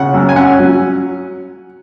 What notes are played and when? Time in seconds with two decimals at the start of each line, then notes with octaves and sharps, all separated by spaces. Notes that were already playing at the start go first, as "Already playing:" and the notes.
Already playing: C#3 F#5
0.14 F#2
0.29 G#5
0.36 C#4 F#5
0.59 F#3